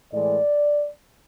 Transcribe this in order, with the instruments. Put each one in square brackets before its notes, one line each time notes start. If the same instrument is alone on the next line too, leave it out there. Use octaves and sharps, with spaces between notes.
[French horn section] A2 E3 G#3 D5